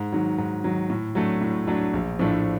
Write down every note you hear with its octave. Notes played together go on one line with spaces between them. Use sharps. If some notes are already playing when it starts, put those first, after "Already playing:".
Already playing: G#2
D#3 F#3
G#2
D#3 F#3
A2
F#3 A3 D4
A2
F#3 A3 D4
A#1
A2 F3 A3 D4